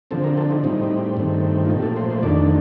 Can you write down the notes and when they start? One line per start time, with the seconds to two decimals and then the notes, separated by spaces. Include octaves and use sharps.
0.11 D3 F3 C4 A4
0.24 A#4
0.37 A4
0.51 D#4
0.64 A2 G3 C4 D#4
1.17 G2 D#3 A3 C4
1.65 F4
1.69 A#2 F3 A3 D#4
1.79 G4
1.82 A4
1.96 C5
2.10 C5
2.22 F2 D#3 A3 D4 D5